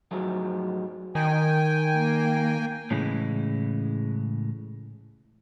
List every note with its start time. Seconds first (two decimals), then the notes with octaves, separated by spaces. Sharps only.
0.11 G#2 F3 F#3 G#3 A3
1.15 D#3 G5 G#5
1.99 A#3
2.91 A2 C#3 E3 G#3